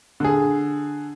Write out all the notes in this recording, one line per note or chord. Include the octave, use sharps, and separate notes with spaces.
D3 G#4